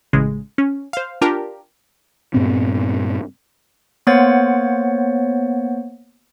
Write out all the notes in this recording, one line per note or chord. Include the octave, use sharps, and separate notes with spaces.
A1 C#3 G#3
C#4
C5 F5
D4 F4 G4 A#4
G2 A#2 B3 C4
A#3 B3 C5 C#5 F#5 A6